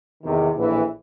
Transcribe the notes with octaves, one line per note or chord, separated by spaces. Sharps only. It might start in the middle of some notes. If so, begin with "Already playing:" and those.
E2 C3 D#3
A#1 A2 E3